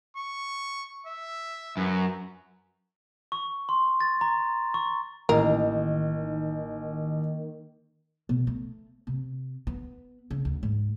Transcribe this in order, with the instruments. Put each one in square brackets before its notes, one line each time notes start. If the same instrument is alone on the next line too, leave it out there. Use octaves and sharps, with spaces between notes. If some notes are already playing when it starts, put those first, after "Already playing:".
[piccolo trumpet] C#6
E5
[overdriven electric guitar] F#2 [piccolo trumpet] B4
[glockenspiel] C#6
C6
A6
A#5
C#6
[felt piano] A1 [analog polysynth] D#3 [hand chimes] A#3 D#5 [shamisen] A#4
[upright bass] B2
A3
C3
B3
C#3
D2
G#2